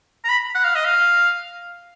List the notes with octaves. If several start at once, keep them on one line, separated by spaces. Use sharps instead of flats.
A#5
B5
F#5
F5
D#5
F5